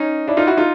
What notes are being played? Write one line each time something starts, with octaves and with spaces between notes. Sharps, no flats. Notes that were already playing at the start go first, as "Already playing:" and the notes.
Already playing: C#4 D#4
D4 E4
D#4 F4
E4 F#4
D#4 F4